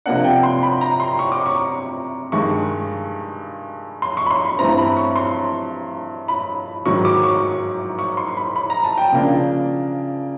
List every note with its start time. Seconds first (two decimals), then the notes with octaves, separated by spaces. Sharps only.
0.06 C3 F3 A#3 D4 F#5
0.24 G5
0.43 C6
0.63 B5
0.81 A#5
1.00 C6
1.19 C#6
1.32 D6
1.46 C#6
2.32 G2 D#3 G#3 C#6
4.02 C6
4.17 C#6
4.26 B5
4.30 C6
4.45 B5
4.59 G2 E3 A3 C4 A#5
4.78 B5
4.97 C#6
5.16 C6
6.28 B5
6.86 G#2 D#3 F#3 C#6
7.05 D6
7.23 C#6
7.99 C#6
8.17 C6
8.37 B5
8.56 B5
8.70 A#5
8.84 A5
8.98 G5
9.12 C#3 F3 A#3 D4